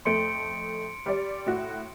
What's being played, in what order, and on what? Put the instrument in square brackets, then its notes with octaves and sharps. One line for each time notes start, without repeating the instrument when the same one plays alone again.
[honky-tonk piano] F2 A3 [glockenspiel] C6 C#7 D7
[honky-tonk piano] G3 D5
A2 F#4